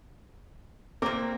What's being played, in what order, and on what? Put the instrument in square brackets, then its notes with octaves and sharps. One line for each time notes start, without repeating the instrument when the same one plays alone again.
[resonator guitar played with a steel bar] A#2 A#4 [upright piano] A#3 C4 D6